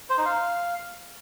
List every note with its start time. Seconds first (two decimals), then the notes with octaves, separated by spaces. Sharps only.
0.10 C5
0.17 D#4
0.25 F5